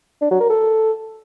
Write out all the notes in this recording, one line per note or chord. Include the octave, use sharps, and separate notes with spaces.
D4
F#3
A#4
A4